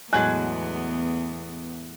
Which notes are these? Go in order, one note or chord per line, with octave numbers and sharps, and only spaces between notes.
E2 A2 F#3 G#3 B3 G#5 F#6